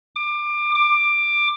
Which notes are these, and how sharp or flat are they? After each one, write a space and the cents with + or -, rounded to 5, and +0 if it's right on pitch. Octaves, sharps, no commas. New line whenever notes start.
D6 +25
D6 +15